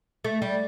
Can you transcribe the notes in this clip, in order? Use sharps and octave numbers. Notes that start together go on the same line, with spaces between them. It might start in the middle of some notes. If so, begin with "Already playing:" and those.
A3
G3